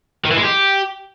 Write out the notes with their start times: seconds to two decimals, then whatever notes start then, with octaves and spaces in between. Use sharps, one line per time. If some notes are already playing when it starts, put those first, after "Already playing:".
0.25 D#3
0.31 E3
0.37 G#3
0.44 G4